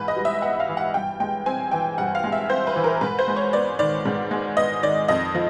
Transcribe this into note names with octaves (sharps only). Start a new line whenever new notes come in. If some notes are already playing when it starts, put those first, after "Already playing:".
Already playing: G#2 E3 B3 B4
D#5
G3
E5
B3 F#5
F5
E3
F#5
G2 G5
G#3 G5
C4 G#5
E3 G5
G2 F#5
F5
G#3
E5
C4 C5
B4
E3
A#4
G#2 B4
C5
G#3
C#5
B3 D5
D#3 D5
G#2
G#3
B3 D#5
D#3 D5
F2 D#5
F3